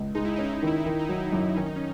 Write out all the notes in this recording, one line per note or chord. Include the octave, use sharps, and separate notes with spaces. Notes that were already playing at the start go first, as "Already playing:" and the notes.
Already playing: C#2
G#3 D#4
E4
C#4 D#4
E4
D#4
D#3 E4
D#4
D#3 E4
D#4
F#3 E4
D#4
F#2
D#3 C#4
D#4
C#4